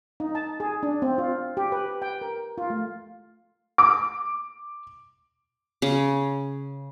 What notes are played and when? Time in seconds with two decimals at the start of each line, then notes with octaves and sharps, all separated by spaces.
0.20 D#4
0.35 A5
0.60 G#4
0.83 D4
1.02 C4
1.18 F4
1.57 G4
1.72 B4
2.02 G5
2.21 A#4
2.58 F4
2.70 A3
3.78 D6
5.82 C#3